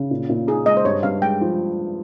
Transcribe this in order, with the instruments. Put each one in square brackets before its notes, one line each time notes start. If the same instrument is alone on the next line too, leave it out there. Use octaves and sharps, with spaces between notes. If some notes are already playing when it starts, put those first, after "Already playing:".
Already playing: [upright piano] C#3
A#2
A#2
[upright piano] D#4 [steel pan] G#4
[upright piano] G#3 [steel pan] D#5
[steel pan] C5
[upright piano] G2 [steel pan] C#5
[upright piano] G2 [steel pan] F5
[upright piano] G#3 [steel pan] G5
[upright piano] F3